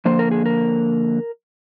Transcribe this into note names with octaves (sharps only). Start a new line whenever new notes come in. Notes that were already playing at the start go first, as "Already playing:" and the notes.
D3 F3 A#3 C5
A#4
G#4
A#4